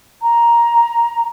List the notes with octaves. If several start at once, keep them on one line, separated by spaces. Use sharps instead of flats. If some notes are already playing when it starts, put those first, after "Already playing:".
A#5